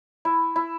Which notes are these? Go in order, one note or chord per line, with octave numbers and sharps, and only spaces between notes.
E4
E4